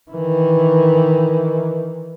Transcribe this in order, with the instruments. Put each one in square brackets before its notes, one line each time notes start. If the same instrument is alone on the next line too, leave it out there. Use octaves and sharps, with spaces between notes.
[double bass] D#3 E3